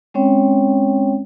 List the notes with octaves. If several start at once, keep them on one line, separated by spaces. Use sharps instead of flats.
G#3 C4 C#4 C#5 G5